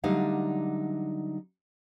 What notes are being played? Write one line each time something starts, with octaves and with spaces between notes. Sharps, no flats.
D3 F#3 G3 A3 D#4 F5